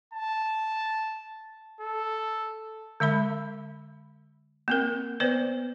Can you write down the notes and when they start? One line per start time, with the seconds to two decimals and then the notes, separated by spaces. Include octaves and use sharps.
0.13 A5
1.81 A4
3.00 D3 G#3 E5 B5
4.68 A#3 C4 A#4
5.20 B3 B4 C5 D5